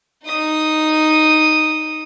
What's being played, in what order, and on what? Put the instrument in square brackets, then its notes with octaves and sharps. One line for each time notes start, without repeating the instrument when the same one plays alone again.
[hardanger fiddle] D#4 D#6